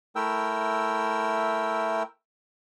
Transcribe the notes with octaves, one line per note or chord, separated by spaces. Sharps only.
A3 E4 A#4 G5 E6